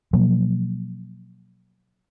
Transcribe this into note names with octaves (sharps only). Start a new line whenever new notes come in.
B2 F3 F#3 A#3